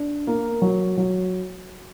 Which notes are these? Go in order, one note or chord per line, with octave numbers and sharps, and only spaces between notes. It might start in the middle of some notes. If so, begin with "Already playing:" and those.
Already playing: D4
A#3
F#3
F#3